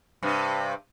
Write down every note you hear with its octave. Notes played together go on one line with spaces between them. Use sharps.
G2 C3